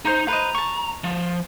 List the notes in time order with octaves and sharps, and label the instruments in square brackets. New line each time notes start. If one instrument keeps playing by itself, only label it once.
[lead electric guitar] D#4 [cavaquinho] C5 A#5
[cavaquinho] B4 C5 D#5 [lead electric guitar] A#5
[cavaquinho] A5 C#6
[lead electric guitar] F3